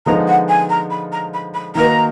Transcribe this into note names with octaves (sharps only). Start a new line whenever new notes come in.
D3 F3 G#3 B3 D#4 A#5
F#5
G#5
A#5
B5
A#5
B5
B5
D#3 A#3 D#4 F#4 B4 A#5